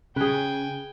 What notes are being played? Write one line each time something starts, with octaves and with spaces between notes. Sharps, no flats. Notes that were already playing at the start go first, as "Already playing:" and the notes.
C#3 G#4 B4 G5 G#5